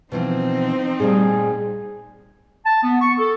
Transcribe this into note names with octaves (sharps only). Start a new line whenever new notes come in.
B2 E3 F3 C4 D#4
A#2 G3 A3 G#4
A5
B3
C#6
A4